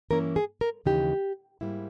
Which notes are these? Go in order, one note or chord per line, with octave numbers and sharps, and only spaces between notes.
G2 E3 A#3 C#4 E4 A#4
G#4
A#4
D#2 C#3 E3 G#3 D#4 G4
G#2 G3 A#3 E4